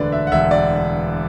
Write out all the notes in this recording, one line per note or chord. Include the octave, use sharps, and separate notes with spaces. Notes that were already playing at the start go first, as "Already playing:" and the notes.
Already playing: E1 D2 D3 B4 D5
E5
F#5
E1 E5
D5